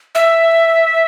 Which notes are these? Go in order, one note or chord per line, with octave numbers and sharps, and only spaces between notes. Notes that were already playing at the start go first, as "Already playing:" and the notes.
E5